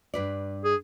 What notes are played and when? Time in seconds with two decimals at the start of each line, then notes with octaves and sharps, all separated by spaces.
0.14 G2 B4 D5
0.65 G#4